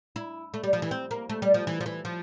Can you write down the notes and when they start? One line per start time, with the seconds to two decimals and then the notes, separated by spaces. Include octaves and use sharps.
0.16 E4
0.54 A3
0.64 G3
0.73 F3
0.82 E3
0.91 C4
1.11 A#3
1.30 A3
1.42 G3
1.54 F3
1.67 E3
1.81 F3
1.86 E3
2.05 F3